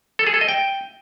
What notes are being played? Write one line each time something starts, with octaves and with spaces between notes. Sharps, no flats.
A4
G#4
A4
D#5
G5